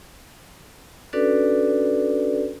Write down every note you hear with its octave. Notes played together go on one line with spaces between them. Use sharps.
C#4 D4 F#4 A4 B4 D5